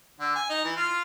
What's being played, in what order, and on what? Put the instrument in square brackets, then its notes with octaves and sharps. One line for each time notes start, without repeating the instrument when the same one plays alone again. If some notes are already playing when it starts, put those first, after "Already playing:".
[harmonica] D3
G#5
D#4
E3
F4